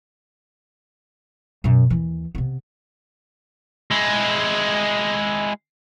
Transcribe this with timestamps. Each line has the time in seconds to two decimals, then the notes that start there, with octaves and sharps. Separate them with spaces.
1.64 F#2 B2
1.90 D#2 E3
2.35 C3 B3
3.91 G#3 E4